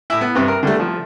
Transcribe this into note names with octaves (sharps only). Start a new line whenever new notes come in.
A2 E4
B3
G2 C3
A#4
D3 G3 A3
F3